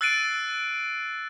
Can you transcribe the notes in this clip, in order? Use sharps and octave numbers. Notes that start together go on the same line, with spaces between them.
E6 F#6 A6 C7 D7 D#7